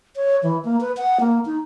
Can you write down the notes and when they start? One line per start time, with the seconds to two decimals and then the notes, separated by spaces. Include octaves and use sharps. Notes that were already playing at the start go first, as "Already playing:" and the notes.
0.16 C#5
0.43 E3
0.65 A#3
0.81 B4
0.97 F#5
1.20 A#3
1.46 D#4